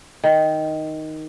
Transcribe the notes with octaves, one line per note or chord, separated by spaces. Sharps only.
D#3